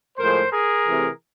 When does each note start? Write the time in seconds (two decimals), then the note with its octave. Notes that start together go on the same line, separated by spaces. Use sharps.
0.18 A2 F3 G#3 A#4 C5
0.51 G#4 A#4
0.85 C3 E3 A3